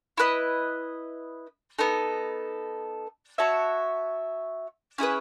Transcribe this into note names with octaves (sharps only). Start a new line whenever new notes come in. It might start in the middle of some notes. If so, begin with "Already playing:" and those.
E4 B4 D#5
B3 D#4 A4
F#4 C#5 E5 A5
C#4 E4 G#4 B4